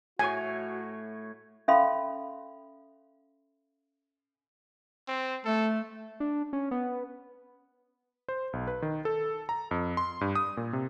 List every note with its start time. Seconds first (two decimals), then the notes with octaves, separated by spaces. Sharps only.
0.19 A2 F#4 C#5 G#5
1.68 C#4 A4 E5 F5 B5 C6
5.08 C4
5.45 A3 A4
6.20 D4
6.53 C#4
6.71 B3
8.29 C5
8.53 B1
8.67 B4
8.82 D#3
9.05 A4
9.49 A#5
9.71 F2
9.97 C6
10.21 G2
10.35 D#6
10.57 A#2
10.73 C3